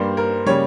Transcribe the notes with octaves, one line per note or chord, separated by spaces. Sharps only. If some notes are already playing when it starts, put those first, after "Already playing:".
Already playing: G2 G3 A#3 C5
A#4
C#3 G3 A#3 C#5